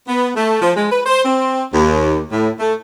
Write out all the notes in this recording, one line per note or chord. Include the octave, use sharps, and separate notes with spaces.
B3
A3
F3
G#3
B4
C5
C4
D#2
A2
A3